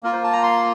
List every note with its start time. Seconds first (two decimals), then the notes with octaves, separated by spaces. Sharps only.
0.03 A#3 F4 A#4
0.13 C5
0.24 A5
0.33 A#5
0.43 C6